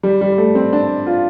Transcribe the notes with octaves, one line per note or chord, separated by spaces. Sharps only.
G3
G3
A3
C4
D4
F4